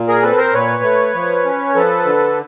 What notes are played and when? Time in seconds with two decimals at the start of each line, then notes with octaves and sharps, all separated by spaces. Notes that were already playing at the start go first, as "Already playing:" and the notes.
Already playing: A#2
0.08 G#4 A#4
0.23 C4 A4 B4
0.38 A#4 C5
0.53 A#2 B4 C#5
0.83 A3
1.14 F3
1.45 C#4
1.75 F3 A4 B4
2.05 D3